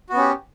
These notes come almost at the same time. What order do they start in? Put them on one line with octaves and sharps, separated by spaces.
F#4 B3 C#4 G4